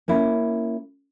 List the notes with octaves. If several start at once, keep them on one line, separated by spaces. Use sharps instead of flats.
A#3 C#4 E4